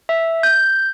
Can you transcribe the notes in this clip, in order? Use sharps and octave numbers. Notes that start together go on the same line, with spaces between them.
E5
G6